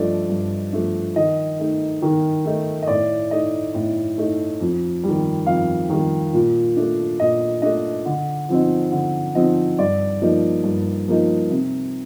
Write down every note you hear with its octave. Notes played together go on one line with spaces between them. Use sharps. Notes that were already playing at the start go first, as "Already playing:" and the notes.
Already playing: G2 F3 A3 D4 D5 D#5
G2
F3 A3 D4
D#3 D#5
A3 D#4
D#3
A3 D#4
D#5
A2 D5
A3 D#4 D#5
A2
A3 D#4
F2
G3
D#3
F2 F5
D#3 G3
A#2
A3 D4
A#2 D#5
A3 D4 D#5
D3
F3 C4 D#4
D3
F3 C4 D#4 D#5
G2 D5
F3 A#3 D#4
G2
F3 A#3 D#4
C3